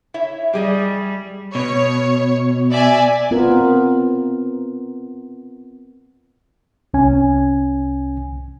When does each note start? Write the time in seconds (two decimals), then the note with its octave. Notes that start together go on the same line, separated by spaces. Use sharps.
0.14 E4 C#5 E5
0.53 G3 G4 G#4 D#5
1.55 B2 C#5
2.73 D5 E5 G#5
3.31 B3 C4 F4 A#4
6.94 C2 C#4 G#5